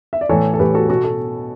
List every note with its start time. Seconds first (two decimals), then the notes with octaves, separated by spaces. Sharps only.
0.13 E5
0.21 D5
0.29 A2 E3 A4 C#5
0.54 A4
0.59 A2 E3 G4 B4
0.75 F#4 A4
0.89 B2 F#4 A4
1.04 F#4 A4